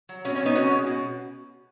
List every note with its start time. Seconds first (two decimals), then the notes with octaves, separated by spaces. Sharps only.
0.09 F#3
0.25 B2 C#4
0.35 C#4
0.40 F#3
0.46 B3 D#4
0.55 B2 C#4 F#4
0.71 G#3
0.87 B2